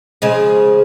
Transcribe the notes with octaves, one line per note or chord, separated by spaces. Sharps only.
C#3 F3 G#3